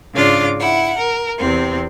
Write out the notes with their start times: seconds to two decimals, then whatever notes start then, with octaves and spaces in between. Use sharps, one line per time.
0.14 G#2 C#3 D4 F4 D6
0.60 E4 F#5
0.99 A#4
1.38 E2 C3 C4